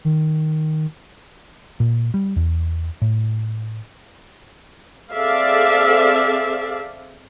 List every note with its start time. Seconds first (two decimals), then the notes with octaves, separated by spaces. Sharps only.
0.05 D#3
1.80 A#2
2.14 G3
2.36 E2
3.02 A2
5.12 C4 G#4 A4 D5 E5 F5